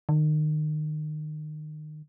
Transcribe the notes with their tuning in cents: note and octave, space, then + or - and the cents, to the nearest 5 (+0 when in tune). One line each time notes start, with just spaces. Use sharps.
D#3 -30